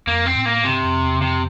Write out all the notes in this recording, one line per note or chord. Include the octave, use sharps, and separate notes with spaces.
F2 A#3
C4
A2
A#3
G2 C3
F2
E2
F2 C3